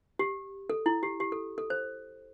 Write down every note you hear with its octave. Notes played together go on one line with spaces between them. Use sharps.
G4
A4
E4
G4
G4
A4
A4
C5